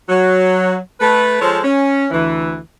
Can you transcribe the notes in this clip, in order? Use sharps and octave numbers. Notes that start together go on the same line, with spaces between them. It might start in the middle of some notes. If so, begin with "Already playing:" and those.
F#3
A3 B4
F3 G#3 A4 C5 C#5
C#4
D2 E3